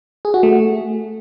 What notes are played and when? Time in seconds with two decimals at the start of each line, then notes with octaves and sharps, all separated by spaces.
0.25 G#4
0.34 F#4
0.43 A3